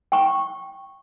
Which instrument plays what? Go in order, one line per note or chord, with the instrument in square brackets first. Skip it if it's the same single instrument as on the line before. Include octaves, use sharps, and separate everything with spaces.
[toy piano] G5 C#6